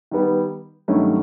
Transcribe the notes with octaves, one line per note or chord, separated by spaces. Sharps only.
D#3 G3 B3
G2 D#3 F#3 A3 C#4